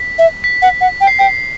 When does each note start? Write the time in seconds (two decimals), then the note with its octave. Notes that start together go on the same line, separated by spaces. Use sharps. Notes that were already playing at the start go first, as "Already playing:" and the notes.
Already playing: B6
0.19 E5
0.44 B6
0.62 F#5
0.81 F#5
1.01 G5
1.07 C7
1.19 G5 B6